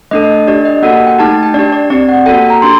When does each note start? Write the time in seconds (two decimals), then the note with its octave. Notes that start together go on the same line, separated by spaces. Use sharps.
0.11 A3 D4 A4 D#5
0.47 D4 G4 D5
0.65 D#5
0.82 A#3 F#4 A4 F#5
1.07 G5
1.19 A3 D#4 G4 A5
1.31 A5
1.43 G5
1.54 D4 G4 D5
1.72 D5
1.90 C4 G4 D5
2.09 F#5
2.26 A#3 F#4 A4 G5
2.50 A#5
2.62 D4 G4 C6